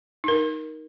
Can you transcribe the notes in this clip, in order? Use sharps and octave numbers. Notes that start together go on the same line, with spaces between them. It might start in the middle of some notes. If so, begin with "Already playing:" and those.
D#4 A#4